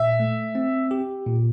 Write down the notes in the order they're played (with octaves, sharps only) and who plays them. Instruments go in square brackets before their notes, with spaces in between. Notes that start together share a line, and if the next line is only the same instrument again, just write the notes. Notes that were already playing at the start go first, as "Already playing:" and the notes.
Already playing: [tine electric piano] A#2 [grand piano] E5
[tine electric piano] A3
C4
G4
A#2